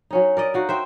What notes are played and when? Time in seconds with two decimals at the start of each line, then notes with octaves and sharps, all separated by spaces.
0.11 F#3 C#4 D#4
0.37 A#4 D5 D#5
0.54 D#4 F#4 F5
0.69 C5 E5 G5